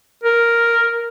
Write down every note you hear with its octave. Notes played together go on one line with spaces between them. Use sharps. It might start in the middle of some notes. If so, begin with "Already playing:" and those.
A#4